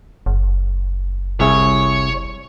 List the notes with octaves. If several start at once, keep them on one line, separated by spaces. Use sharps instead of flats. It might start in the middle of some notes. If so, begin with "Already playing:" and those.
F#1
C2 G#4 C#5 E5